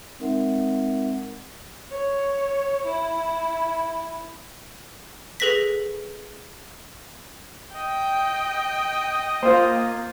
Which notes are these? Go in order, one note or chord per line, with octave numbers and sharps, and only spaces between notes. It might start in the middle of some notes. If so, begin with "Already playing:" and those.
G#3 C4 D#4 A#4 E5 F#5
C#5
E4
G#4 A4 B4 A#6 B6
D#5 G5
A#3 F4 C5